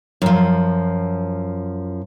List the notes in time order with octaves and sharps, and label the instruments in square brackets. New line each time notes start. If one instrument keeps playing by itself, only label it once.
[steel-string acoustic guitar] F#2 F3